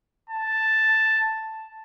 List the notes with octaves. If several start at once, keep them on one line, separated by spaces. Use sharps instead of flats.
A5